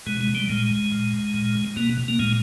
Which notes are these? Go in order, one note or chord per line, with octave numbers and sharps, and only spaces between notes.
B2 G#3
G#3
G3
A#2 G#3
A#2
A#2
B2 A#3
A#3
A#2 G#3